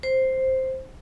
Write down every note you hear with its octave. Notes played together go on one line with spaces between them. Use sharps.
C5